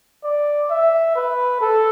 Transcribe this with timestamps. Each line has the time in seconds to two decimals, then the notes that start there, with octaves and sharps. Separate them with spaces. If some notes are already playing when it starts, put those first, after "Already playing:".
0.24 D5
0.70 E5
1.16 B4
1.61 A4